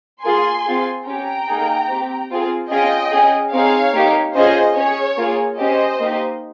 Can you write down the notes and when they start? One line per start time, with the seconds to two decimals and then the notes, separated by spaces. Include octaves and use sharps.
0.24 A#3 F4 G#4 G#5 C6
0.66 C4 F4 G#4
1.06 C#4 G4 G5 A#5
1.48 A#3 D#4 G#4
1.89 C4 G4
2.30 C4 F4 G#4
2.70 C#4 F4 G#4 D#5 G5
3.12 C#4 G#4
3.53 C4 D#4 G#4 C#5 F5
3.94 A#3 D#4 G4
4.35 C#4 F4 G#4 C5 D#5
4.76 C#4 G#4 C#5
5.18 A#3 F4 G#4
5.58 C#4 G4 C5 D#5
6.00 A#3 D#4 G4